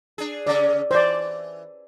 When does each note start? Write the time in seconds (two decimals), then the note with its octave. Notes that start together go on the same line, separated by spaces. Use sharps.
0.18 D4 G#4
0.47 C#3 C#4 D5
0.91 E3 C5 D5